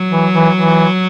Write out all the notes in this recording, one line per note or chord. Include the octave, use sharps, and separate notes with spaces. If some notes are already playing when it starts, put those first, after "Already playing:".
Already playing: F#3
E3
E3
E3